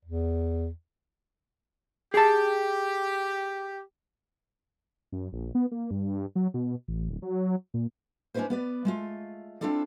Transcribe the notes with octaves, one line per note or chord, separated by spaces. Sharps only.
E2
G4 G#4 A5
F#2
A#1
B3
A#3
G2
F#3
B2
A1
D1
F#3
A#2
C#4 D4 E4 F#4 B4 C5
B3 B4 D5
G#3 A3 F4
C4 D4 E4 F4 A4 D5